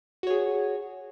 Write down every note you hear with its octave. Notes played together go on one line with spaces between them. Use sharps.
F#4 G#4 C#5